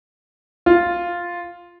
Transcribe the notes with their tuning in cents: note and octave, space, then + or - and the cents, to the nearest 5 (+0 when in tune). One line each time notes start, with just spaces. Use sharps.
F4 +0 F5 +0